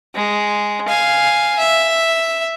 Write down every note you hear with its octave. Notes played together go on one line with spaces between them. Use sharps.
G#3
F5 G#5
E5